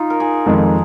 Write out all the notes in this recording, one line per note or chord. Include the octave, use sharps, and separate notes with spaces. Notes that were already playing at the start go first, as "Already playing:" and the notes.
Already playing: D#4 F4
A#4
G#4
F2 D#3 G#3